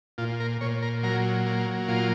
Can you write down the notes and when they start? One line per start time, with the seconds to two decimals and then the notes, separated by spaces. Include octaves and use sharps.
0.18 A#2 F4
0.40 A#4
0.61 A#2 C#5
0.82 A#4
1.03 F#3 A#4
1.46 A#3
1.88 A#2 F4